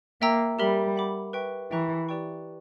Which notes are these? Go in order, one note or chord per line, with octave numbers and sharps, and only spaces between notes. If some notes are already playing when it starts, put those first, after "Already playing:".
A#3 A#4 E5 G5 A#5 E6
G3 G4 A#4 E5 B5
F#5 B5 D6
B4 E5 G5 C#6
E3 E5 G5 A#5 C#6 F#6
G4 B4 D5 G5 C#6